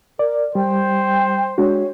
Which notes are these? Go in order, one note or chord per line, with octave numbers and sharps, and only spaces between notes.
A#4 D5
G3 C5 G5
G#3 D4 F#4 C#5